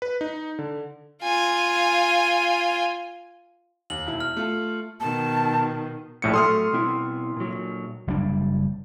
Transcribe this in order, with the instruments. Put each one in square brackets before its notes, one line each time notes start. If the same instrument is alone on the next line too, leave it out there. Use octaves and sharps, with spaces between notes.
[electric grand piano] B4
D#4
D3
[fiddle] F4 G#5
[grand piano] D#2 [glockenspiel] F#7
[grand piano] E1 E4
[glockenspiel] F6
[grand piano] A3 F4
[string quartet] B2 D#3 [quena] A5
[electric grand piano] A#1 A2 C#7
[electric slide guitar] A2 F#3 A4 [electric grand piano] C6 D#6 F6
[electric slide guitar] B2 C4 E4
A#2 F#3
[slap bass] F#1 F#3 G3 D4